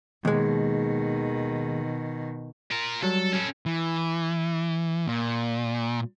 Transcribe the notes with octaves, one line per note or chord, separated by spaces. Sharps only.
D#2 B2 D#3 G#3
F4 A#4
F#3 G3 A4
C#4 A4
E3
A#2